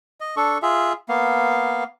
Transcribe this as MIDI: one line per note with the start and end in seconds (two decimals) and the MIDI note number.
0.21 0.35 75
0.37 0.58 62
0.37 0.58 69
0.37 0.58 85
0.62 0.93 65
0.62 0.93 68
0.62 0.93 76
1.09 1.84 58
1.09 1.84 59
1.09 1.84 77